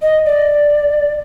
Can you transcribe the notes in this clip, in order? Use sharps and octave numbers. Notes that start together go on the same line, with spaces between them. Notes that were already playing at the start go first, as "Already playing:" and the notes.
D#5
D5